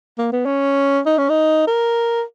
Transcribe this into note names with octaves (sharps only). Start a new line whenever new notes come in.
A#3
B3
C#4
D#4
C#4
D#4
A#4